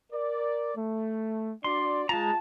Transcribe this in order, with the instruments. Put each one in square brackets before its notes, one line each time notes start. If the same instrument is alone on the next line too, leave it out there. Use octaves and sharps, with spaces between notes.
[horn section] A#4 D5
A3
[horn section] D4 F#4 D5 [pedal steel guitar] C6
[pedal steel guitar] G#3 A#5 [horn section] F4 A5